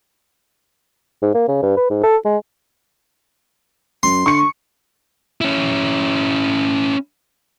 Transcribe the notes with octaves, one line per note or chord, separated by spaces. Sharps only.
G#2
A#3
C#3
G2
B4
G#2
A4
G#3
F#2 C6
D3 C#6 C#7
C#4 E4